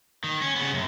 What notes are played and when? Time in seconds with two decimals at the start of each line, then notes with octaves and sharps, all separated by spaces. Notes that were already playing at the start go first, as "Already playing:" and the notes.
0.24 D#3
0.41 C#4
0.56 C#3 B3
0.73 F#2 C3